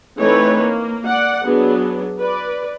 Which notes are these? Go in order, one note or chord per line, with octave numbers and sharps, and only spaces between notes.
E3 A3 C4 D#4 B4 C#5
A#3
D5 F#5
F#3 B3 D4 G#4
B4 D5